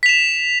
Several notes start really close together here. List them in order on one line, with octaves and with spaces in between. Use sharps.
B6 F7 E7